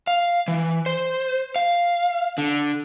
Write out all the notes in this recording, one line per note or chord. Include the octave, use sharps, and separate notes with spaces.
F5
E3
C5
F5
D3